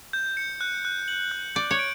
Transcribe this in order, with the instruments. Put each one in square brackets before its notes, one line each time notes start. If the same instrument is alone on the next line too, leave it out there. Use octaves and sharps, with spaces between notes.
[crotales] G6
C#7
F#6
F#6
F#7
F#6
[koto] D5 [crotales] G6
[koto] C#5
[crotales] D7